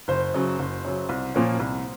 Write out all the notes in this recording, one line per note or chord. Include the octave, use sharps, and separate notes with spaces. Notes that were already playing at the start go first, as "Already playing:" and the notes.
F#1 C5
F#2 C#3 F#3
F#1
F#2 C#3 F#3
C2
A#2 F3 A#3 C#4
C2